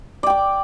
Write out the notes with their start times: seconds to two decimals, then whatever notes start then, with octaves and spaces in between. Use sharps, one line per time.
0.23 D5
0.27 G5
0.30 D6